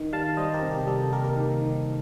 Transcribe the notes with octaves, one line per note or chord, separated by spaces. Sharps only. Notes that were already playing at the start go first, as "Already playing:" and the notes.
Already playing: D#3
G3 F5 A5
G3 C5 D#5
G4 A#4
C3
G4
G3 A4
A4
A#3 G4 A#4
G4 A#4
D#3
D#3